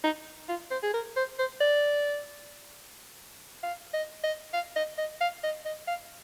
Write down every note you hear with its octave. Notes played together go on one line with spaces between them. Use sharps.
D#4
F4
C5
G#4
A#4
C5
C5
D5
F5
D#5
D#5
F5
D#5
D#5
F5
D#5
D#5
F5